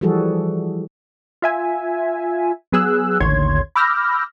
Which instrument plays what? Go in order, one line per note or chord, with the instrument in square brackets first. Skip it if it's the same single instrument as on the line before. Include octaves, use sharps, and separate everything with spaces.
[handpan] E3 F3 G3 F#4 G#4 A4
[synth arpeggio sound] F4 E5 G#5
F#3 B3 G#4 E6 F#6
A1 D#2 D3 C#5 C6 G#6
B5 D6 E6 F6 G6 A#6